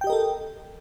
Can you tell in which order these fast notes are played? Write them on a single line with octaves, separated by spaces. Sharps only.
G5 G4 D#5 A#4 A4